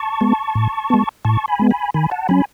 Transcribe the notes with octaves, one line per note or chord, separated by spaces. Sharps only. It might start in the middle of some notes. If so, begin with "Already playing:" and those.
Already playing: A5 C#6
G#3 B3
A2
G#3 B3
A2 A5 C#6
G#5 B5
G#3 B3
G#5 B5
D#3 G#5 B5
F#5 A5
F#3 C#4 G#5 B5